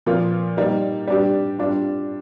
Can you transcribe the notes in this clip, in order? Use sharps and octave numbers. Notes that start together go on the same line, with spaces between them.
A#2 F3 A#3 F4
G3 A#3 D#4
G3 D4 G4
G3 D4 F4